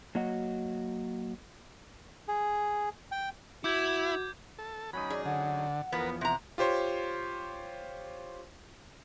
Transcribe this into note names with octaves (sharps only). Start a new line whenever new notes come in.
F#3 A#3 F#4 D#5 F#5
G#4
G5
E4 F#4 D6 G6 G#6
A4
F#3 C#4 D#4 B5
G#4 D5
D3 F#5
E2 F3 B3 A#4 B4
C3 F#5 A#5
F4 G4 C5 C#5 C6